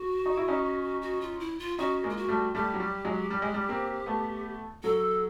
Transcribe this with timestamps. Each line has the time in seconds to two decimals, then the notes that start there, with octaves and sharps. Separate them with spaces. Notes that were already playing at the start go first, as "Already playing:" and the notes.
Already playing: F#4
0.26 D#4
0.37 E4
0.48 C#4 D#4
1.02 F#4
1.21 F4
1.40 E4
1.59 F4
1.78 C#4 D#4 F#4
2.03 G#3 A#3
2.09 F4
2.17 F#4
2.28 G3 A3
2.55 G3 A3 G4
2.74 F#3
2.80 G3
3.05 F#3 G#3
3.30 G3
3.42 G#3
3.54 G3
3.69 A#3 C4
4.06 A3 B3
4.83 F#3 A4